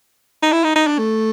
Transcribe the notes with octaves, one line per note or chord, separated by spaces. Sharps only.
D#4
E4
D#4
D#4
D4
A3